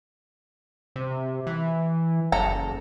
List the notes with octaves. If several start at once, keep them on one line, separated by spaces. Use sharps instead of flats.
C3
E3
F#1 A4 A#5